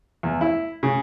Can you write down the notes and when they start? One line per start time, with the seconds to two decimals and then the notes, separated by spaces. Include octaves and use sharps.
0.23 E2
0.41 E4
0.83 C#3